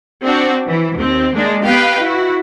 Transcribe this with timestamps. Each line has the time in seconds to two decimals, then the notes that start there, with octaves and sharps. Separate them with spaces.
0.24 C4 D4 F#4
0.67 E3
0.97 D#2 C4
1.34 G#3 A#3 D4
1.64 B3 G4 B4 D#5 F5 G5
1.99 E4 F#4